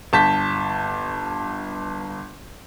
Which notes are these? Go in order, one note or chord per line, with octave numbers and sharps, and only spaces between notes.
G1 A5 G6 B6